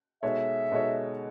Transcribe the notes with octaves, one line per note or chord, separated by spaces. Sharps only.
B2 G#3 D#4 A4 C#5 E5
B2 G#3 D#4 A4 C#5